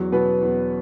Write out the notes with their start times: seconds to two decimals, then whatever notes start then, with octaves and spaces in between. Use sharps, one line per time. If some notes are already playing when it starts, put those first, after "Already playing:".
Already playing: E2 F#3 F#4
0.12 B2 F#3 B3 B4
0.41 E2